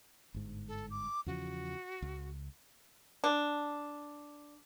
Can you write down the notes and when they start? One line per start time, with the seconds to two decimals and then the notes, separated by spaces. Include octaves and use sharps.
0.34 G1 G#2
0.67 A4
0.90 D6
1.26 E2 C#3 F3 F#4
2.02 C#2
3.24 D4